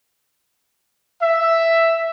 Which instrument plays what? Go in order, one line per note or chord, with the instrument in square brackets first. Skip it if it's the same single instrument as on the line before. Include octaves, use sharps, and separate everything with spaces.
[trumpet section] E5